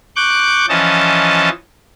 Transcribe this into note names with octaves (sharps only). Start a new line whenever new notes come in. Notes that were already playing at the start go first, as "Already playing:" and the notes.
C#6 D6 F#6 G6
E3 F3 C#4 D#5 A5